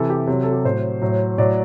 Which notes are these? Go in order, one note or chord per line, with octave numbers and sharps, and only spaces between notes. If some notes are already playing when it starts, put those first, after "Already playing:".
Already playing: C3 E3 A4
G4
C3 F#3
A4
G4
A2 F#3 C5
A2 F#3
A2 F#3 D5